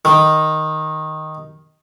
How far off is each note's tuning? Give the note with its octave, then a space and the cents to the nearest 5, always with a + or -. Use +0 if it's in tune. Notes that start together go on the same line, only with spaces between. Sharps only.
D#3 +0